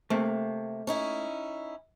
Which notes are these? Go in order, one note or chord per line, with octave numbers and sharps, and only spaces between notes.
C3 A3 A#3
C#4 D#4 E4